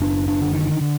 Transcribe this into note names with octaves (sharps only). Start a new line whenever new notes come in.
F#1 D4
D4
D3
D#3
D3